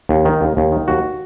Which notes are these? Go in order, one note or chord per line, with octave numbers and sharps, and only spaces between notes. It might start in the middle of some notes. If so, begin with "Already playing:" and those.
D#2
D#3
D#2
D#2
D#3
D#2 F#4